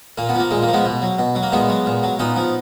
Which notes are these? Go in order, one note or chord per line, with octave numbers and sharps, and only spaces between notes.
A#2 A#3
B3
F3 A#3
A#2 G#3
A#3
F3
G#3 B3
B2
F#3
B2
F#3
A#3
A#2 G#3 B3
F#3
A#2
F#3
A#2 B3 D#4
F3